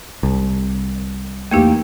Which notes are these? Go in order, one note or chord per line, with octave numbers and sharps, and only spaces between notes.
C2
E2 A3 A#3 D#4 G4 G5